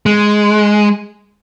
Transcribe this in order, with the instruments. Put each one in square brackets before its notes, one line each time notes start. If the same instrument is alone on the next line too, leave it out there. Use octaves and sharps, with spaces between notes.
[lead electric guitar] G#3